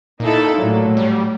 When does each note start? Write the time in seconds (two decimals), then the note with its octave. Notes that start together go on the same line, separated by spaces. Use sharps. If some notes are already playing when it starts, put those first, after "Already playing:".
0.20 A#2 D#4 E4 A4
0.55 A2 F#3
0.97 G3